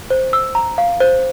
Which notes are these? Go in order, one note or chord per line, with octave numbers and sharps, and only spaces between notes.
C5
E6
A#5
F5
C5